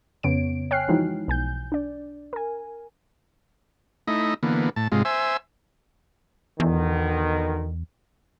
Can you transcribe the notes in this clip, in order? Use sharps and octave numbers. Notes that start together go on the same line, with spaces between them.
F2 C#3 B3 C#5 D7
C#5 G5 G#5 F6 F#6 C7
E3 F3 G#3 D#4 E4 F#4
B1 G#5 G6
D4 D5
A#4 G#5
A3 D#4 E4 D#5
D3 E3 A#3 B3
A2 A5
G#2 C3 G#3 F4
C5 E5 G#5 E6
E2 B2 D3 D#3